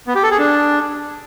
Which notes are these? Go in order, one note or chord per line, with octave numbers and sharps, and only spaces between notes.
B3
G4
A4
G#4
D4